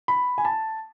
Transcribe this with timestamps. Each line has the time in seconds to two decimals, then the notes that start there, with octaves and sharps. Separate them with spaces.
0.08 B5
0.38 G#5
0.45 A5